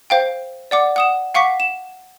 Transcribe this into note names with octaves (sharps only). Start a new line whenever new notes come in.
C5 F5 G5
D5 F#5 D6
F#5 D#6 E7
F5 F#5 C#6 D6 B6
E7